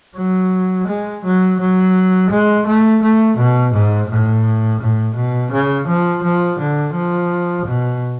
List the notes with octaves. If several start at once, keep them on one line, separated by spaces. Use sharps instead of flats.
F#3
G#3
F#3
F#3
G#3
A3
A3
B2
G#2
A2
A2
B2
C#3
F3
F3
D3
F3
B2